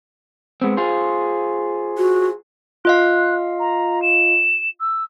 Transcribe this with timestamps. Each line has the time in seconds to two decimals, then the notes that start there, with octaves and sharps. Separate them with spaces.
0.62 G#3 B3 C4
0.77 F4 G#4 C5
1.98 F#4
2.85 F4 D#5 F5 F#6
3.59 A#5
4.02 E7
4.80 E6